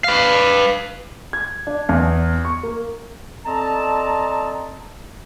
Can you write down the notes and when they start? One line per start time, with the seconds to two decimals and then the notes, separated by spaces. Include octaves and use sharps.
0.04 B4 F5
1.33 G#6
1.67 D4
1.89 E2
2.45 C#6
2.63 A#3
3.46 C4 A4 D5 D#5 A5 A#5